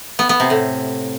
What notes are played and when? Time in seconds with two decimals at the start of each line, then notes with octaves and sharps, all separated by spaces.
0.19 B3
0.29 B3
0.40 C3
0.50 A2